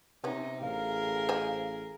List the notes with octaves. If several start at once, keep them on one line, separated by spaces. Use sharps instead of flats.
C3 B3 C#4 D#4
A1 G#4 A#4 F5
C5 D#5 G#5